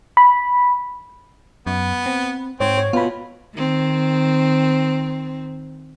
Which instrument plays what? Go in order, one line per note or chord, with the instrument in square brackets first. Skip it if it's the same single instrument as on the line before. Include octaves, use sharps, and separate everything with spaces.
[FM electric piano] B5
[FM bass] F#2 [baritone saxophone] B3
[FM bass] C4
[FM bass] G#2 [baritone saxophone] C4 [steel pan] C#5
[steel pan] C#5
[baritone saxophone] B2 [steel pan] B3 B5 [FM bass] F4
[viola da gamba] D#3 C4